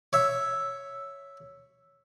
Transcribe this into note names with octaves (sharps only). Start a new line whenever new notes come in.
C#5 E5